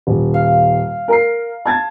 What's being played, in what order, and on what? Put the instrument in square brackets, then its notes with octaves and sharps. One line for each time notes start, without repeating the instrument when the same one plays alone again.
[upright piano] D#1
[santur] F5
[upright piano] A#4 A#5 C7
A5 G#6 A6